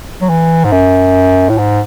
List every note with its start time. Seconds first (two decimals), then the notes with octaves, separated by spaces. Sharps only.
0.22 F#3
0.29 E3
0.65 G#2
0.72 F#2
1.49 A2
1.58 G#2